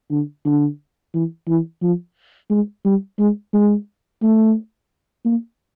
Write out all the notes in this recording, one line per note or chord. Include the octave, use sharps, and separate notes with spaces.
D3
D3
E3
E3
F3
G#3
G3
G#3
G#3
A3
A#3